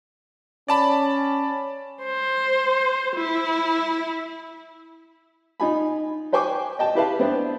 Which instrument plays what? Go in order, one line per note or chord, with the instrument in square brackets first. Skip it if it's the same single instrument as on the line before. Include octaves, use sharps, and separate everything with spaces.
[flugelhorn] C#4 [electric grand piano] D5 A5 B5
[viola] C5
E4
[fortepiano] D#4 F4 G#5 B5
B4 C5 G5 G#5 C#6 D6
D#5 G5 A5
E4 G4 B4 E5 F5 A5
B3 C4 D4